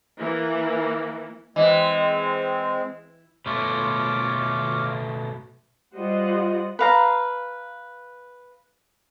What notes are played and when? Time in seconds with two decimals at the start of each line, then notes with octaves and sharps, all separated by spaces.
0.20 E3 A#3
1.56 E3 G#3 C4 D#5
3.46 B2 A3 F4 C#5 D6
5.96 G3 F4 C5 D#5 F#5
6.79 B4 F5 A#5